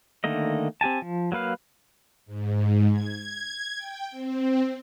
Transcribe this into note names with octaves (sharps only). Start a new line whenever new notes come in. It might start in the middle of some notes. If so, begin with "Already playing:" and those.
D3 D#3 A3 A#3 D#5
C4 G4 G#5 A5
F3
F#3 A#3 B4 F5
G#2
G#6
G5
C4